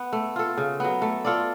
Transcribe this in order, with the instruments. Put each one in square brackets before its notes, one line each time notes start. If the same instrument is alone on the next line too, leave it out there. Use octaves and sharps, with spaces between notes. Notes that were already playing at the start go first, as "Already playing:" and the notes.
Already playing: [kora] B3
A3
F4 A4
C#3
F#3 B3
A3
F4 A4 D5